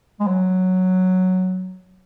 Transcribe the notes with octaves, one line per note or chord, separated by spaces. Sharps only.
G#3
F#3